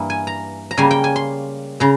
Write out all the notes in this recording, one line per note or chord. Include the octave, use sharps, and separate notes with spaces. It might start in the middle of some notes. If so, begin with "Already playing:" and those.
Already playing: G2 E3 A#3
G#5
A#5
A#5
C#3 G3 A#3 G#5
G5
G#5
C6
C#3 A#5